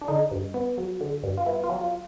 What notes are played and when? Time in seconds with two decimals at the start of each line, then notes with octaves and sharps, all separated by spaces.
0.01 D4
0.08 D3 D#4
0.31 G2
0.54 B3
0.78 F#3
1.01 D3
1.23 G2
1.37 F4
1.46 B3 E4
1.64 F4
1.69 F#3
1.81 F4